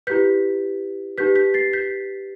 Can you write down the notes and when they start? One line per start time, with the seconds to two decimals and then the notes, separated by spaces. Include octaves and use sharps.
0.07 E4 G4 B4 G6 B6
1.18 D#4 G4 B4 G6 B6
1.35 G6 B6
1.54 A6 C7
1.73 G6 B6